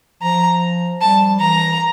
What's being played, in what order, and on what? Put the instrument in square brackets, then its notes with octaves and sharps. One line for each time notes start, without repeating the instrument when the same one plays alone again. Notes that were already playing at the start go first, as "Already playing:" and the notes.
[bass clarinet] F3 [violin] A#5
[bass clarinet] G3 [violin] A5
[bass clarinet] E3 [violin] A#5